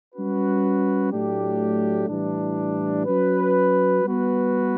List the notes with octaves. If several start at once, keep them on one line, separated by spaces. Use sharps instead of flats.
G3 C#4 F#4 B4
A2 F#3 A3 D4 G4
A2 E3 G3 D4
F#3 C#4 F#4 B4
G3 B3 F#4 B4